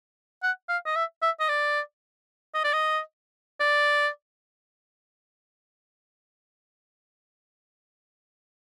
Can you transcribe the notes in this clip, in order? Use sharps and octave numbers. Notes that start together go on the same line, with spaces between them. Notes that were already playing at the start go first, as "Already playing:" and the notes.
F#5
F5
D#5
E5
E5
D#5
D5
D#5
D5
D#5
D5